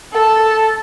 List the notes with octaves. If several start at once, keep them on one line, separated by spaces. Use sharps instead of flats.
A4 A5